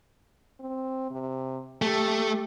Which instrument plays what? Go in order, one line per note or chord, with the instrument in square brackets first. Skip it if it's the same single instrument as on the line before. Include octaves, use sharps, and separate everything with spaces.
[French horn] C4
C3
[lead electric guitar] A3 [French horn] G4